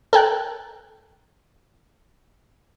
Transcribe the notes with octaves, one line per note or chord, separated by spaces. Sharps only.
A4 A#4 G5 F#6